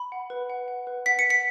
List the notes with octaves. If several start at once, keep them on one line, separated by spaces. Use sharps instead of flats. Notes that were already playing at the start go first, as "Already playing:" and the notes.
Already playing: B5
F#5
B4
F#5
F#5
B4
F#5 B6
C#7
F#5
B6